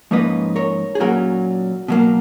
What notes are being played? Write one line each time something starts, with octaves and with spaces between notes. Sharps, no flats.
G#2 F3 A#3 C#4 B4 D#5
A#4 C#5
G#4
A#2 F#3 C#4 F#4 A#4
B2 F#3 A#3